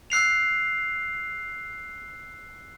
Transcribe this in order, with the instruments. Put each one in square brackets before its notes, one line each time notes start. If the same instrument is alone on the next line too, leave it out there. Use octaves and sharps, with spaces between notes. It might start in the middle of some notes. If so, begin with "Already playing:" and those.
[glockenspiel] E6 F#6 C7 F7